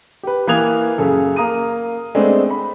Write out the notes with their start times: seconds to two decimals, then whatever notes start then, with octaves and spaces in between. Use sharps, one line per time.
0.23 G4 B4
0.47 E3 A#3 D#6 F#6 G#6 F7
0.98 F#2 C#3 A4
1.36 A#3 A#5 D#6 D#7
2.15 G#3 A3 B3 C4 D4
2.50 B5